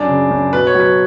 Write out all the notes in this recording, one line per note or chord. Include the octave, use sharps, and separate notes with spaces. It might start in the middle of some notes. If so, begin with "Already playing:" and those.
Already playing: F#2 D4
C#3
F#2
B2 B4
C#5
F#3
B4